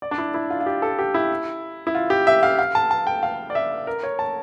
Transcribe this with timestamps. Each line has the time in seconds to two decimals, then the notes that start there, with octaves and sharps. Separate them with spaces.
0.02 D5
0.11 D4
0.18 E4
0.34 E4
0.50 F4
0.60 F4
0.66 G4
0.82 A4
0.99 G4
1.14 E4
1.87 E4
1.95 F4
2.10 G4
2.27 E5
2.43 F5
2.58 F5
2.75 A5
2.91 A5
3.07 G5
3.23 F5
3.50 D5
3.55 E5
3.87 A#4
4.03 C#5
4.19 A5